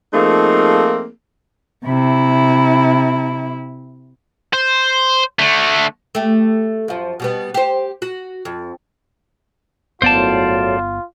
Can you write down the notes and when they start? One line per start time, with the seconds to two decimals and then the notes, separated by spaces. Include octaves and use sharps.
0.13 F3 A3 A#3 C4 D#4 G#4
1.86 C3 E4
4.53 C5
5.39 D3 A3
6.15 A3 G4
6.88 F#2 F3
7.20 B2 G3 B3
7.54 G4 C5
8.02 F#4
8.45 F2
10.02 G1 F#2 A2 B3 F4 C5 D5 A5